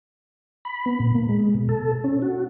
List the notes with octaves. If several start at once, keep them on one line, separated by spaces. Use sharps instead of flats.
B5
B3
A#2
A#3
G#3
B2
A4
C#4
F#4